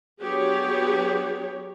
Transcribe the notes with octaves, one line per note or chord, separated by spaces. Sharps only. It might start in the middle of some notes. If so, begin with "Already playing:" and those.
F#3 B3 D4 G4 G#4 C#5